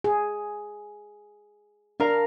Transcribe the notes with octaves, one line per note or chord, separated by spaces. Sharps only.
G#4
D4 A#4 F5